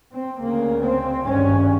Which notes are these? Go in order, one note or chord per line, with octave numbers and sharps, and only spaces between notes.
C4
D2 C#3 A#3
C4
G#1 G2 C#4